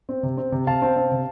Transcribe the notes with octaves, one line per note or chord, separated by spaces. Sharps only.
C4
C3
C4
C3
C3 F5 A5
C4
C4
C3